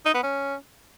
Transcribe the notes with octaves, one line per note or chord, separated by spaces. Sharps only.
D#4
B3
C#4